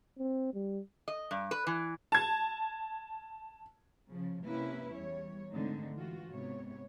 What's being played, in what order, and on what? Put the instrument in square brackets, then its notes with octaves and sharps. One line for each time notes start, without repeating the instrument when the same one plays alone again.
[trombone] C4
G3
[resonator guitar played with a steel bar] D#5
G2
B4
E3
[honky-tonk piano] A5 G#6
[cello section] C#3 F3
C3 A#3 C#4 E4 B4
E2 G3 C#5
G#2 D3 D#3 A3 C4 D#4
E3 F4 F#4
G#2 C3 B3 C#5